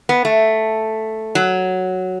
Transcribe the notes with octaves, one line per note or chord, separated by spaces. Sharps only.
B3
A3
F#3